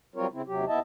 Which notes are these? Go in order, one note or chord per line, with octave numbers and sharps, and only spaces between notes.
F#3 G3 C4 F4 A#4 C#5
C#3 C4 E4
D#2 C3 F#3 G4
D#2 B3 E4 D#5 E5 A5